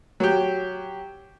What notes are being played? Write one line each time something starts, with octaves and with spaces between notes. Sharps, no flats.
F#3 G4